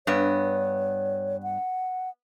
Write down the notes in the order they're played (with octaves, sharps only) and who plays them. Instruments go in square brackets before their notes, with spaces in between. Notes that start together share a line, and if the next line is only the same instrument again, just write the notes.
[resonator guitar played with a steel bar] G2 B3 [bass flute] C#5
[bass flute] F#5